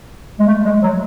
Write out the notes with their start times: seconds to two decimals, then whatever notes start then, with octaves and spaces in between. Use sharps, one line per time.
0.39 G#3
0.46 A3
0.65 G#3
0.82 F#3